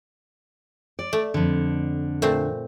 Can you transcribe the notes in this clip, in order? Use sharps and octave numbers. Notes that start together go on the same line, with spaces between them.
D5
A3
F2 D3
A#2 A3 C4